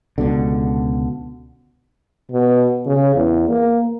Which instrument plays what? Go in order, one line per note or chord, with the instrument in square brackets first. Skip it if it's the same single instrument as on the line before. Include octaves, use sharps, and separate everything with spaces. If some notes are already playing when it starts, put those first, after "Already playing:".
[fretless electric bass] C#2 B2 D3
[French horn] B2
C#3
E2
A#3